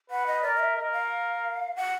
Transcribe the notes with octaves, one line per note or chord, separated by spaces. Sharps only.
B4 F#5
D#5
A#4 D5
D#5
E5
A#4 D#5
F5
F#5